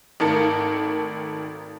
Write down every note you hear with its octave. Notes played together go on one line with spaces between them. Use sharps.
G#1 D#3 A3 A#4 A5 C#7